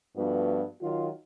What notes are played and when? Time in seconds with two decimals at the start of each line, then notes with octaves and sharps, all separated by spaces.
0.16 G2 F3 A3 B3 F#4
0.81 D#3 F#3 F4